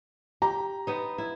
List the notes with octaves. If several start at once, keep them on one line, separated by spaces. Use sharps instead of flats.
G4 A#5
B3 D#4
E4